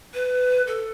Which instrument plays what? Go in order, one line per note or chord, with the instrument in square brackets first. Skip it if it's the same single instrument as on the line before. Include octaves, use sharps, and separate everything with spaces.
[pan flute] B4
A4